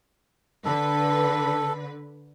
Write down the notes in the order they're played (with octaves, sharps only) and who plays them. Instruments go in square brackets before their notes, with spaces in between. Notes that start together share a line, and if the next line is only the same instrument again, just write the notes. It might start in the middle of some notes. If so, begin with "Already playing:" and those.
[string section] D3 B4 [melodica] A4